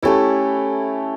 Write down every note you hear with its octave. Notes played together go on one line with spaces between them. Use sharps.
A3 C#4 E4 G4 A4